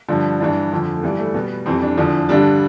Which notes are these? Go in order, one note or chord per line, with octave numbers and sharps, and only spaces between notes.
G2 D3 F3
G2 E3 G3 D4
F2 D3 F3
A3
G2 E3 G3 B3
A3
B2 G3 B3
F2 E3 G3 C4
D4
E2 D3 F3
G2 D3 G3 D4